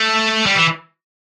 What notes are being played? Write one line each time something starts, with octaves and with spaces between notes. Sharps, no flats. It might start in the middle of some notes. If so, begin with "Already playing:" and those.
Already playing: A3
G3
E3